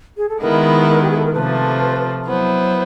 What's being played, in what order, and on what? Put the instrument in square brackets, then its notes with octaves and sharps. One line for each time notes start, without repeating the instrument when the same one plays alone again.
[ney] G#4
A4
[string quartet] D#3 G#3 B3 E4 [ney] A#4
[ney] G4
G#4
A4
A#4
[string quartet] C3 F3 A3 [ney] B4
[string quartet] F#3 B3 E4 [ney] C5